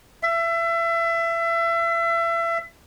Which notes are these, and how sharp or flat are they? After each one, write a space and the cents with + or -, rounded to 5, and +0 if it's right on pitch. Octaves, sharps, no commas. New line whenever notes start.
E5 +30